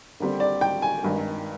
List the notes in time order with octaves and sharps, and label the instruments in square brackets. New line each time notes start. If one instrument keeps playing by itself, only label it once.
[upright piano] D#2 D3 G3 C4
D5
G5
G#5
G#1 G2 D#3